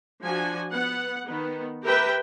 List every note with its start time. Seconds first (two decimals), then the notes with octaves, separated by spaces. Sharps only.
0.23 F3 D4 F#4 G#5
0.72 B3 F#5
1.26 D#3 B3
1.83 G4 A#4 B4 E5 G5